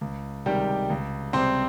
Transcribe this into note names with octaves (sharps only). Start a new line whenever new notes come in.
C#2
C3 D#3 G3 G#3 G4
C#2
C3 G3 C4 C5